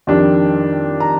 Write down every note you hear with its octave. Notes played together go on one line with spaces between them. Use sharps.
F2 D#3 G3 D4
A#5